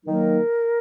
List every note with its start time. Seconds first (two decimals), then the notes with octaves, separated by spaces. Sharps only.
0.05 D#3 F#3 A#3 D#4 A#4